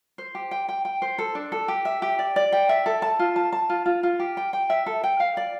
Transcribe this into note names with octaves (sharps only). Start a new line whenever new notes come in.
C5
G4
G5
G5
G5
C5
A4
D4
A4
G4
E5
G4
D5
D5
G5
E5
A4
A5
F4
A5
A5
F4
F4
F4
G4
G5
G5
E5
A4
G5
F5
D5